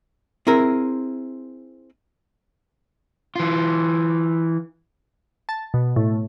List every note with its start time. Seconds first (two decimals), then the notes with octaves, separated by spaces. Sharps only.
0.47 C4 E4 G#4 A#4
3.36 E3 F4
5.49 A5
5.74 B2
5.96 A2